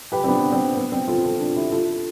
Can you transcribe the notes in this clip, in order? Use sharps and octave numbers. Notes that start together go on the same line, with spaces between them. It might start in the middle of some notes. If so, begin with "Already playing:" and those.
G4 B4
C4
B3 D4
C4
B3
C4
F4 A4
F4 A4
D4 F4
E4 G4
F4 A4